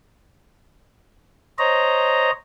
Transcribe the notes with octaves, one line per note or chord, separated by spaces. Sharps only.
C5 C#5 D#5 A#5